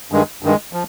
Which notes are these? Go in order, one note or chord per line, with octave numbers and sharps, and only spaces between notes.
G2 D#3 G#3
G2 D#3 G#3
F3